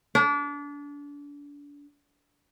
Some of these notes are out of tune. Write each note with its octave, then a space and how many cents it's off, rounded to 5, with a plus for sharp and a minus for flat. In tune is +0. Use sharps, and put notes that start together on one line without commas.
D4 -30